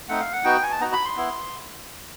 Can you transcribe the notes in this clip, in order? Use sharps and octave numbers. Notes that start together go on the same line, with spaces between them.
A3 C4 D#4 F#5
F5
F#5
B3 D#4 F#4 G5
G#5
A5
B3 D#4 F#4 A#5
B5
C6
B3 E4